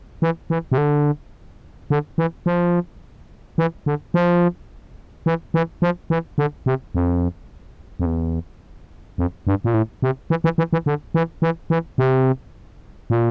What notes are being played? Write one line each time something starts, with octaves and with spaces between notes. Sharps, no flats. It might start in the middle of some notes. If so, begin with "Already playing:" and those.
E3
E3
C3
D3
D3
E3
F3
E3
D3
F3
E3
E3
F3
E3
D3
C3
F2
F2
E2
F2
G2
A#2
A2
C3
E3
E3
E3
E3
D3
E3
E3
E3
C3
A#2